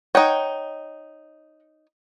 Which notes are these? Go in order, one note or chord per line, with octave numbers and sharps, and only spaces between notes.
D#4 C#5 D#5 F#5 G5